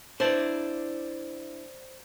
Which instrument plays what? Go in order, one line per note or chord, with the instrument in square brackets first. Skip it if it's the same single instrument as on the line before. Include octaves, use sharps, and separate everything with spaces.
[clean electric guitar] D4 E4 A5 [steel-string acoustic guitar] C5 D5